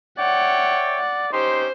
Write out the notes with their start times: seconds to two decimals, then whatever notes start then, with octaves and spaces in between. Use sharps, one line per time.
0.18 C#5 D5 E5 F#5 G5
0.98 F#5
1.33 C#4 D#4 G4 C5 C6